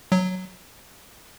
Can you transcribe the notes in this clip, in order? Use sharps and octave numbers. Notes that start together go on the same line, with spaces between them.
F#3